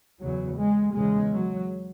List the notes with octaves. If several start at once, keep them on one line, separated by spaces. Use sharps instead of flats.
E2 C#3 F#3
G#3
E2 C#3 G#3
F#3